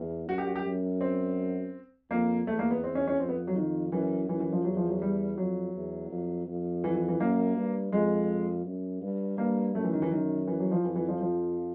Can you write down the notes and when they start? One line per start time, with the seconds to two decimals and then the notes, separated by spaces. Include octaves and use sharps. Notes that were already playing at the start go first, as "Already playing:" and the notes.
Already playing: E2
0.28 F#2 F#4
0.38 G4
0.47 F#4
0.56 G4
0.65 F#2
1.01 C4
2.10 F2 A#3
2.47 E2 A3
2.59 A#3
2.71 B3
2.84 C4
2.95 C#4
3.07 C#4
3.19 F2 C4
3.29 B3
3.47 F#3
3.56 D#3
3.92 F#2 E3
4.29 F#2 E3
4.40 E3
4.52 F3
4.64 E2 F#3
4.77 F3
4.89 F#3
5.02 G3
5.37 F2 F#3
5.74 E2
6.10 F2
6.47 F2
6.84 E3
6.95 E3
7.08 E3
7.20 F#2 A#3
7.56 G2
7.92 F2 G#3
8.65 F#2
9.02 G2
9.38 G2 A#3
9.75 F#2 A3
9.84 E3
9.93 D#3
10.02 E3
10.11 F#2 D#3
10.47 E3
10.60 F#3
10.71 F3
10.84 F2 E3
10.96 E3
11.08 F3
11.21 F3